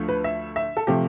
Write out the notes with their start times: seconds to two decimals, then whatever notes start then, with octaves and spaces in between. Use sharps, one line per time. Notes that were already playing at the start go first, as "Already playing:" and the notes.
Already playing: D2 F3 A3
0.09 B4
0.24 E5
0.56 E5
0.77 A4
0.87 C3 F3 A3 G4